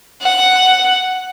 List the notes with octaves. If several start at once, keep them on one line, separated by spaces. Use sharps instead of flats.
F#5